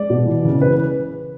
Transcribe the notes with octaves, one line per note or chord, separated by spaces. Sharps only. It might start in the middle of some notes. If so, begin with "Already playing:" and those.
Already playing: G#3 D5
B2
E3
C#3
E3 B4